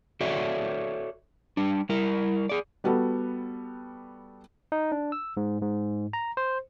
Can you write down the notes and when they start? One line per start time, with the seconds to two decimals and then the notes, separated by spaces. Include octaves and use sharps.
0.21 F#4 A4 C#5 D5 E5
1.57 G3 D4
1.89 G3 E4 A#4
2.49 G#4 D5
2.84 G3 B3 F#4 A4
4.72 D#4
4.92 D4
5.12 E6
5.37 G#2
5.62 G#2
6.13 A#5
6.37 C5